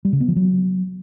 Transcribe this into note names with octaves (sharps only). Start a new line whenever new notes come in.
G3
C#3
B3
F3
F#3